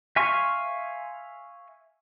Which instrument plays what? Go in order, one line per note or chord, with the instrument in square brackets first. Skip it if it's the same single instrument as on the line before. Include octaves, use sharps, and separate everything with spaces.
[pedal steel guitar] E5 F5 G#5 C6 C#6